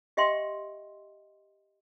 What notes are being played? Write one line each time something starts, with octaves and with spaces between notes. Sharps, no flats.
G4 D#5 E5 G5 C6